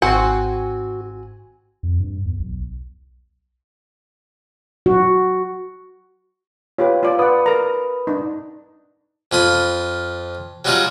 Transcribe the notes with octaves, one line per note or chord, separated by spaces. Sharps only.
G#1 C4 F#4 F#5 G#5
F2
G2
E2
B1
F#4
F4 G4 B4 C#5
F4 D5
B4 D5 F#5 B5 D#6
A#4 A#5
D4 D#4
F2 F4 B5 D#6
F#3 G3 D#4 F4 G4 G#4